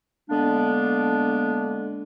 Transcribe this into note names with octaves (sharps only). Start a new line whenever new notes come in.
D3 G#3 A#3 B3 D4